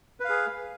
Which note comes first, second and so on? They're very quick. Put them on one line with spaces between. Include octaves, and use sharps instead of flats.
B4 F5 G#4